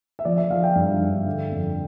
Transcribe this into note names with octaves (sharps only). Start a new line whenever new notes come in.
E5
F3 D5
E5
F3 F5
G5
G2
G2
D3
F2